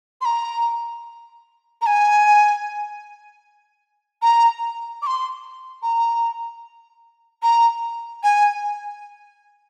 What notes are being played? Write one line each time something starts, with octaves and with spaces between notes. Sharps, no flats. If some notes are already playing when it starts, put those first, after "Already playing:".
C6
A#5
A#5
G#5
A#5
D6
C6
A#5
A#5
G#5